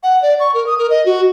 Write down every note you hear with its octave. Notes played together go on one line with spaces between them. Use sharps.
F#5
D5
C#6
A#4
D#6
A#4
D#5
F#4